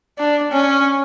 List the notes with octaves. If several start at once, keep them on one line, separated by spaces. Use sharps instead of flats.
D4
C#4